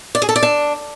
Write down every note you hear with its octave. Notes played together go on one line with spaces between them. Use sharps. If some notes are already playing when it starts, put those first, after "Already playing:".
D5
G#4
A4
D5
D4